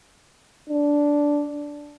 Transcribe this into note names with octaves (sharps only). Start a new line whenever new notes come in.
D4